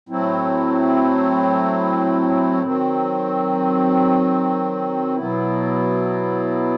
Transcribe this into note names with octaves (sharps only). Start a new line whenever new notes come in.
A2 F#3 C4 E4
D#3 F#3 C4
B2 F#3 B3 E4